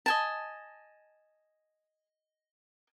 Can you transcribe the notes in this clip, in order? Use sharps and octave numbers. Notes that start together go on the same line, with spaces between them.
D#5 G#5 A5